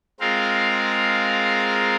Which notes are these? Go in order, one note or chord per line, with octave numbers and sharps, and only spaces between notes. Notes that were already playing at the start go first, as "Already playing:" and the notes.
G#3 C4 F4 A#4 F5